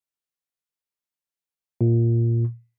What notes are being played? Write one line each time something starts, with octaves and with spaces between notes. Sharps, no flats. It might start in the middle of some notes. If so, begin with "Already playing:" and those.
A#2